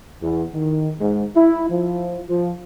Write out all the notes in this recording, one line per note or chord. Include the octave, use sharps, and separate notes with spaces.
E2
D#3
G#2
E4
F3
F3